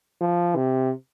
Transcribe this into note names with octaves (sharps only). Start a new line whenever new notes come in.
F3
C3